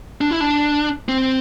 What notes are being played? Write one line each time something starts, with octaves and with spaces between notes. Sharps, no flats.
D4
E4
D4
C4